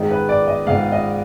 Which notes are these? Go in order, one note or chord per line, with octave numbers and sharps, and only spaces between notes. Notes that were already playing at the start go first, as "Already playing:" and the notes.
Already playing: G#2 D#3 G#3
B4
D5
D#5
G#2 D#3 G#3 F5
D#5